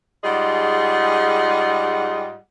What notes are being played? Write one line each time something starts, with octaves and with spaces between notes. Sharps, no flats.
G#2 G3 F4 G#4 D#5 F#5